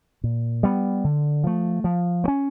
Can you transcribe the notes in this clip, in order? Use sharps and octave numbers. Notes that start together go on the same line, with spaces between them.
A#2
G3 B3
D3
F3 A3
F3
A3
C#4